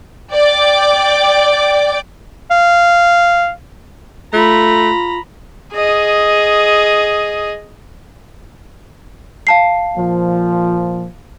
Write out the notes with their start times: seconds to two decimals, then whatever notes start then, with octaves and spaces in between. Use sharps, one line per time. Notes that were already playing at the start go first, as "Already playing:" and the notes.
0.32 D5 G5 D6
2.51 F5
4.33 A3 F4 A#5 B5
5.74 G#4 D#5
9.47 F5 A5 C7
9.96 A#2 F3